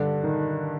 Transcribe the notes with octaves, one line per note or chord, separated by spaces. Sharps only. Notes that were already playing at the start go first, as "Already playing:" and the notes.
Already playing: G2 D3 D4
D#3